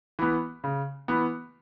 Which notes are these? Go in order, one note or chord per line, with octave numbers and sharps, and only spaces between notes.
E3 B3
C#3
E3 B3